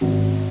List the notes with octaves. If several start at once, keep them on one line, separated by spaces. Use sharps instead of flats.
G#1